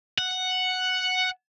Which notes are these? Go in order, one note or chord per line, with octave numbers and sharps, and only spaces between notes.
F#5